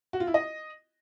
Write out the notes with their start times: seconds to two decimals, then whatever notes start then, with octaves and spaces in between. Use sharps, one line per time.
0.13 F#4
0.20 F4
0.27 E4
0.34 D#5